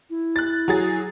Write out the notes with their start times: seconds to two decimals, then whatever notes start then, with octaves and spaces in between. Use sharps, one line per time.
0.10 E4
0.36 F#6 A6
0.68 F#3 G#4 A6